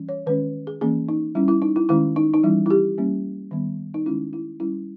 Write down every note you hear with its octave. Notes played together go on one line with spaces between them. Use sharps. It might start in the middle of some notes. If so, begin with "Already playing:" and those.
Already playing: E3 G3 C#4
C#5
D#3 G#3 C#4 B4
G#4
E3 A#3 C#4 G#4
D#4
G3 C#4 E4
E4
D#4
E4
D#3 G#3 C#4 E4
D#4
D#4
E3 G3 C#4 E4
E4
G4
G3 A#3 C#4
D#3 G3 B3
D#4
D#3 G#3 C#4 E4
E4
G3 C#4 E4